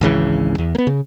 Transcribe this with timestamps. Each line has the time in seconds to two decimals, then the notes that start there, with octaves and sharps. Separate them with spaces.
0.01 G#1 C#2 C#3 E3
0.58 E2
0.75 A#3 B3
0.87 C#3